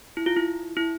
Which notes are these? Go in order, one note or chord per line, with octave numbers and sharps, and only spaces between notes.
E4
F4
E4
E4